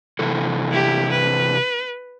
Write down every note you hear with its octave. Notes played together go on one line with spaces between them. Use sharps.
C3 E3 A4
E4 G4
B4